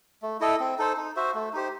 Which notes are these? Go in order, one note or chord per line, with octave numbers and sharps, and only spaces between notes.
A3
E4 A4 D#5
C4
D#4 A4 C5
D#4
F#4 C5 E5
A3
D#4 G4 C5